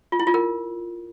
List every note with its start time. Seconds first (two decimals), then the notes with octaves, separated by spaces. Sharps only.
0.12 F4
0.20 E4
0.27 F4
0.34 A#4